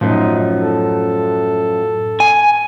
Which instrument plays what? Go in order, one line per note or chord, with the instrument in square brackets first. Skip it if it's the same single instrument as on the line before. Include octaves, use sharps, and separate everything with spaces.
[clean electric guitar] F#2 F3 [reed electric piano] A2 [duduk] D#4
[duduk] A4
[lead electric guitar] G#5